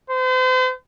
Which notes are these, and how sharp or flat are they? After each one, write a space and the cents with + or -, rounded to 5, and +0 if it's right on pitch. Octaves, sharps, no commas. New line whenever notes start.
C5 -40